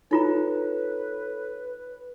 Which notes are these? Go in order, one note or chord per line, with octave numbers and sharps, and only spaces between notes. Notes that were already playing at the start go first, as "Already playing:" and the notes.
D#4 F4 A4 B4 C#5 A#5